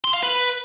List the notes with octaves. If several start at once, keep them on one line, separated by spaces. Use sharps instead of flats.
C6
F5
B4